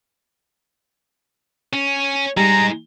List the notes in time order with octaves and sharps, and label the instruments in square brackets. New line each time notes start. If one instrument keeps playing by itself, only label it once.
[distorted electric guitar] C#4
[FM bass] G3 [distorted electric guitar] G#3 D#4 [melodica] A#5